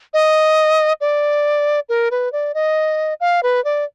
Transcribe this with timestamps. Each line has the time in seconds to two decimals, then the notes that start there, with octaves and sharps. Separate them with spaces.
0.14 D#5
1.01 D5
1.89 A#4
2.11 B4
2.32 D5
2.54 D#5
3.20 F5
3.43 B4
3.64 D5